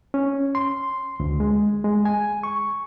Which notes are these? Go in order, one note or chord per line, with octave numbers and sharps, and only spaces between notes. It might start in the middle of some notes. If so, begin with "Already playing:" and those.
C#4
C6
D2
G#3
G#3
G#5
C#6